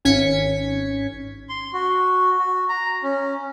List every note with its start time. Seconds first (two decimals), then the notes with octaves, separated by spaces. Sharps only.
0.05 G#1 C#4 G#6 B6 C#7
1.49 C6
1.73 F#4
2.38 F#4
2.69 A#5
3.03 C#4